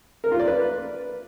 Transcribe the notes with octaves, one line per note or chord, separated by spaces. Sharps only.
A#4
F4
D5
B4